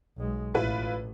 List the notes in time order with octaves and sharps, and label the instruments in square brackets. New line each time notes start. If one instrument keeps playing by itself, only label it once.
[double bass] B1 G#3
[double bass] A1 [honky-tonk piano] E4 F4 B4